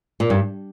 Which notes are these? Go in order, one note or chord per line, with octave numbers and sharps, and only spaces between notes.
A#2
G2